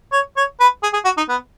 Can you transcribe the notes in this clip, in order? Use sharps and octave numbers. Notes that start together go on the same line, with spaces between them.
C#5
C#5
B4
G#4
G#4
F#4
D#4
B3